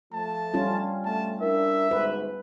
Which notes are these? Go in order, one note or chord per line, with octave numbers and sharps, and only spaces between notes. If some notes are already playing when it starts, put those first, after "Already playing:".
F3 A3 A5
G3 C#4 F4
A3 A5
D4 E4 A#4 E5
D2 G#2 B4